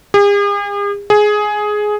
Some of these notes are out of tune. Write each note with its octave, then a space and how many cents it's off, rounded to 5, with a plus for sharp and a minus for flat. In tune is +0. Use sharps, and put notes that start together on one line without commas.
G#4 -45
G#4 +10